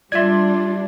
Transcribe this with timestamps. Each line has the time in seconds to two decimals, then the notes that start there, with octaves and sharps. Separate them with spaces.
0.12 G3 D4 F4 D5 E5 C6 G#6